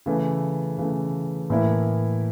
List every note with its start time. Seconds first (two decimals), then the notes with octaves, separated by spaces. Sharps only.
0.06 C#3 E3 A3
0.78 C#3 E3 A3
1.50 A2 E3 A#3 E4